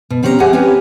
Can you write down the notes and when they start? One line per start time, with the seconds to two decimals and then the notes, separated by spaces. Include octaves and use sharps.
0.10 B2
0.23 B2 C4 C#4 G4 A#4 A#5
0.40 G4 G#4 C5 E5 F#5 G#5
0.53 C4 C#4 E4 G4 B4 C#5